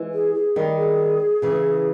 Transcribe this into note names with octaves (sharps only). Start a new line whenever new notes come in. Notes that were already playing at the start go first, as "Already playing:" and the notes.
Already playing: E3 G#3
G#4
G#4
D#3 G3
G#4
C#3 E3